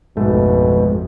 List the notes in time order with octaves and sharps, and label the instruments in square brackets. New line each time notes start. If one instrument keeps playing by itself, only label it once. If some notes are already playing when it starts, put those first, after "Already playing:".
[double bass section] A1 F2 [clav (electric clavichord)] G#2 A3 [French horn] B2